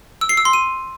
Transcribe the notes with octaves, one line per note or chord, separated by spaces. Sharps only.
E6
C7
E6
C6
D#7